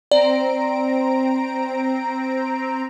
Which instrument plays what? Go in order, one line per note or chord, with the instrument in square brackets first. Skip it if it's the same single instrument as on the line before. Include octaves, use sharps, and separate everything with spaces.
[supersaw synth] C4 A#5 D7 [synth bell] D5